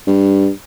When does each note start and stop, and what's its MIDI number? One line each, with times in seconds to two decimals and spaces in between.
0.07 0.49 43